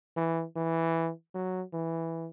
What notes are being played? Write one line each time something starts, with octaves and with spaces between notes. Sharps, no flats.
E3
E3
F#3
E3